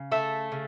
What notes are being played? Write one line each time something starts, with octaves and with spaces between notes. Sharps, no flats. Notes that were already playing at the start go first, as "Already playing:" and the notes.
Already playing: C#3
A3 E5
C#3